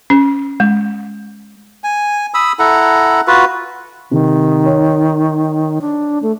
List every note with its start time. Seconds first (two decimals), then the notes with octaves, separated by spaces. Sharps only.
0.10 C#4
0.60 G#3
1.84 G#5
2.34 B5 D#6 E6
2.59 E4 A4 F#5 A#5
3.27 F4 F#4 B4
4.11 C3 D#3
4.66 C#5
5.81 D4
6.23 A3